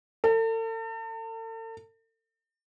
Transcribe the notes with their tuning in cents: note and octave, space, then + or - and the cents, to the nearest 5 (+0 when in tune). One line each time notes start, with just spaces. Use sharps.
A4 +40